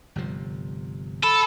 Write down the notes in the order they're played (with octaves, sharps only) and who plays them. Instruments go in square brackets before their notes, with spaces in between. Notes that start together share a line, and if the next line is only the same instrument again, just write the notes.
[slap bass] G1 C3 F3
[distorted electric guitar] A4 [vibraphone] B5